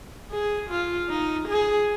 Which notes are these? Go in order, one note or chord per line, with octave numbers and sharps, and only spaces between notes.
G#4
F4
D#4
G#4